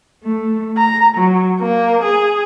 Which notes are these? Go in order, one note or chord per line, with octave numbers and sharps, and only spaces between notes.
A3
A#5
F#3
A#3
G#4